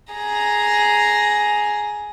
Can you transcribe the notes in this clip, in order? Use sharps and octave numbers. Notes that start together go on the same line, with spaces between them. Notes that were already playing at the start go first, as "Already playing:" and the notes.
G#4 A#5